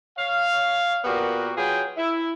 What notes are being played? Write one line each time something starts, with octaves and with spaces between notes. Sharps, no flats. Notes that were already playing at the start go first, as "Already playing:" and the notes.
C#5 F5
A#2 B3 F#4 G4 A#4
F#3 F4 G#4 B4 G5
E4